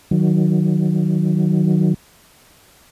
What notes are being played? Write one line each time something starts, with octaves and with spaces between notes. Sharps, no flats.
D#3 F#3